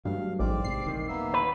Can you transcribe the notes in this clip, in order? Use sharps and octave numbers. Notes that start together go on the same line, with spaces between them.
G2 F#3 A3 F5
A1 G#2 C4 D5 D6
G#2 C3 C7
D#1 D#3
A#3 B3 E5
B4